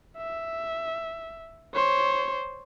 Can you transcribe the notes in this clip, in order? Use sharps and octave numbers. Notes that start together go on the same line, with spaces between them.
E5
C5 C#5